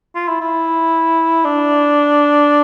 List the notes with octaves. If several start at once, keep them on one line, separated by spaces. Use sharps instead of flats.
F4
E4
E4
D4